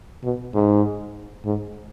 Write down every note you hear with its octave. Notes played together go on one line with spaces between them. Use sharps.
B2
G#2
G#2